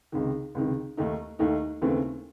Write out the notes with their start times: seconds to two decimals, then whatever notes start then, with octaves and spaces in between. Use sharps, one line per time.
0.12 C#2 C3 D#3
0.55 C#2 C3 D#3
0.97 D#2 D#3 A3 D#4
1.39 D#2 D#3 A3 D#4
1.82 D#2 C#3 E3 A3 C4